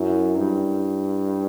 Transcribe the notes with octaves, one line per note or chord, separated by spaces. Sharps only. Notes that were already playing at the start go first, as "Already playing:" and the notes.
Already playing: F#2 E4
G2